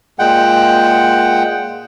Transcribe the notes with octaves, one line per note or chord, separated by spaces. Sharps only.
A#2 G#3 F#5 G5